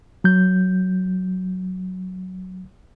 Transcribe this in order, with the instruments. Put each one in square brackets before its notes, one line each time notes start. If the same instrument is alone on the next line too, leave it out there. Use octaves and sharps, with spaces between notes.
[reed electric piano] F#3 G6